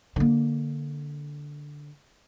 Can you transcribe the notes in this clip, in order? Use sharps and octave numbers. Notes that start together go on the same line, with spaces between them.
D3 A#3